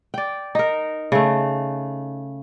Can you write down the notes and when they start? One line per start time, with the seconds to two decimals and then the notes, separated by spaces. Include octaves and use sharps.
0.14 D5 G5
0.55 D#4 A#4
1.12 C#3 A3